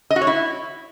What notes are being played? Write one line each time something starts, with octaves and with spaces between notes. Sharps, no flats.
D#5
F#4
C#5
E4